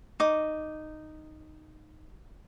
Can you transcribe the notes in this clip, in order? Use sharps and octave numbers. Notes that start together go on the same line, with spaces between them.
D#4 D6